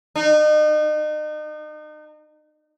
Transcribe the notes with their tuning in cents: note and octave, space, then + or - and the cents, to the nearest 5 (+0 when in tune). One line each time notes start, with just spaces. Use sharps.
D#4 -35